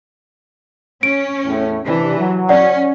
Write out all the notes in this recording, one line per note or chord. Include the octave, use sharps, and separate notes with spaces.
C#4 D7
E2 A2 A3
C3 E3 D4
F#3
C#4 D5 F#5